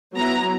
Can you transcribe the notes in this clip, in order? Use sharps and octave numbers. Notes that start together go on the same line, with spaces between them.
F#3 B3 E4 A#5